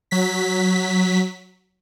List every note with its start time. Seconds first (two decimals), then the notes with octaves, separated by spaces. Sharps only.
0.11 F#3 B6